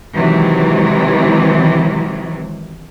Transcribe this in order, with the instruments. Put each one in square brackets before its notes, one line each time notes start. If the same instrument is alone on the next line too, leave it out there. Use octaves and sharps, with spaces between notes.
[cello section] C3 D#3 E3 F#3 G#3